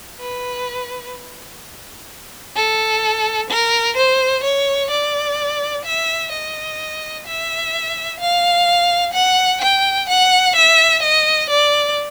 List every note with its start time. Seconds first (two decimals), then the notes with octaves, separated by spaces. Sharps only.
0.21 B4
2.56 A4
3.50 A#4
3.97 C5
4.44 C#5
4.91 D5
5.85 E5
6.32 D#5
7.27 E5
8.20 F5
9.14 F#5
9.61 G5
10.09 F#5
10.56 E5
11.03 D#5
11.50 D5